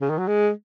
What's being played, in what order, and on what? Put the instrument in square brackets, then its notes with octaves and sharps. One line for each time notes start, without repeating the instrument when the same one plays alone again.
[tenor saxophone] C#3
D#3
F#3
G#3